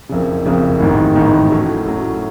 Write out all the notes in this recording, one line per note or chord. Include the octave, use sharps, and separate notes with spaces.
F#1 F2 C#3
F#1 F2 C#3
A1 G#2 D#3
A1 G#2 D#3
A2 F#3 A3 C#4
A2 F#3 A3 C#4